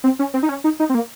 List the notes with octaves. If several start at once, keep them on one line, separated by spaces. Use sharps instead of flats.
C4
C#4
C4
D#4
C#4
D#4
D#4
C4
A#3